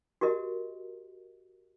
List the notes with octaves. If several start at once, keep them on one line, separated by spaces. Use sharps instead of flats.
F#4 G4 A#4 D#5